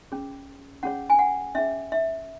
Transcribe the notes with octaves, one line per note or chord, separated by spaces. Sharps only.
C#4 G#4 C#5
C#4 G#4 C#5 F#5
G#5
F#5
C#4 G#4 C#5 E5
E5